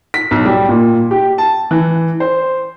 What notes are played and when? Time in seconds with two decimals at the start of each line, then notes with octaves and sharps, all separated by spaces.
0.14 B6
0.31 B1
0.45 G3
0.69 A#2
1.11 G4
1.38 A5
1.71 E3
2.20 C5